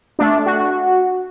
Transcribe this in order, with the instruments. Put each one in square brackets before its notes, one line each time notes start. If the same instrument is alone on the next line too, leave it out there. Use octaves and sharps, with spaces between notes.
[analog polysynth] A3 D4
F#4